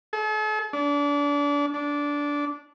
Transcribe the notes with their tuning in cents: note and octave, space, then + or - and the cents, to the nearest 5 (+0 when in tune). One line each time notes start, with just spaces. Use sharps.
A4 -45
D4 -30
D4 -15